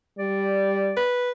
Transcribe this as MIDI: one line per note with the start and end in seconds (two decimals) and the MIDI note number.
0.19 0.95 55
0.19 1.15 74
0.97 1.31 71